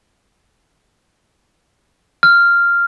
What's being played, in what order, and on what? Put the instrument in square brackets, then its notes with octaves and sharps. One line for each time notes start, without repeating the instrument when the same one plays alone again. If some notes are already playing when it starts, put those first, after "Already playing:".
[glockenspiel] F6